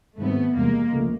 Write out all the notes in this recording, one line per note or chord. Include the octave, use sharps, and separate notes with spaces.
G#2 D#3 G3 A3 B3 C4
E2 C3 E3 G3 G#3 A#3
C#2 C#3 F3 A3